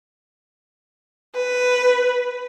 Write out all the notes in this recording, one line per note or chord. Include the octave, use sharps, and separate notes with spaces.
B4